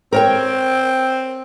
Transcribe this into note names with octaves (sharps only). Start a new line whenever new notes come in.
C4 A#4 C#5 G5